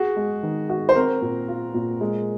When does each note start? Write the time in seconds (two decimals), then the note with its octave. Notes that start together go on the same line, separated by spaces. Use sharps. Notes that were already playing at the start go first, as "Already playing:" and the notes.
Already playing: F#4 G#4
0.16 G#3
0.43 D#3
0.69 F#4
0.89 C5
0.95 C4 A#4
1.22 A#2
1.48 F4
1.74 A#2
2.01 G#3